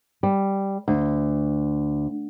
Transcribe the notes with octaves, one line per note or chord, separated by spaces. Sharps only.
G3
D2